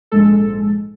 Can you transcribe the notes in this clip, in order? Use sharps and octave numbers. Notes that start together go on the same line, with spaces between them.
A#1 G#2 G#3 A4